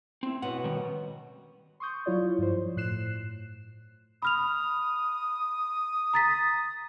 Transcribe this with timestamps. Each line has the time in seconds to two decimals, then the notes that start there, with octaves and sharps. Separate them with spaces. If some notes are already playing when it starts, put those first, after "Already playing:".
0.23 C4 E4
0.42 B2 C#4 F#5
0.64 D#3 G3
1.80 C6 C#6 D#6 G6
2.06 F#3 E4 F4 C#5 D5
2.39 G2 F3 C5
2.77 A2 F#6 C7 E7
4.22 B5 D#6 F6 F7
6.14 A#5 A6 B6